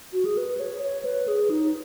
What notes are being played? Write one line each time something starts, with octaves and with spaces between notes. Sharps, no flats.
F#4
G#4
B4
C#5
C#5
B4
G#4
D#4